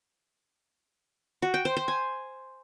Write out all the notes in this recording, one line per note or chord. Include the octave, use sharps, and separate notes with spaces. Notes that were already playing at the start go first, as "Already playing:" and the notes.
F#4
G5
C5
C5
G#5